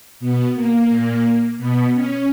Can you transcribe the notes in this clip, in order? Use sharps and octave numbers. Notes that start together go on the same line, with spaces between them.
B2 B3
A#3
A#2
B2 B3
C#4